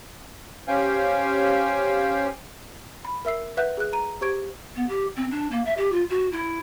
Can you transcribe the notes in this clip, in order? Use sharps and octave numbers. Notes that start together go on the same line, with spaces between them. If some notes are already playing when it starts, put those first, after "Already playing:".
C#4 G4 C5 F5 G5 G#5
B5
A#4 E5 E6 C7
B4 E5 F#5 F#6 G6
G#4 F#6
A#5 D#7
G4 C5 C#6 G#6 D7
B3
G4
C4
D4
A#3
E5
G4
F4
F#4
E4